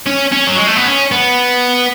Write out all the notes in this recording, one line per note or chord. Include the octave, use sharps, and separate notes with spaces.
C#4
C#4
F#3
G#3
A3
B3
C#4
B3